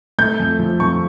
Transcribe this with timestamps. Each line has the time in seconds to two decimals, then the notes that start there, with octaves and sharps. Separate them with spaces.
0.18 A3 G6
0.40 F2
0.59 F3
0.80 F2 C#6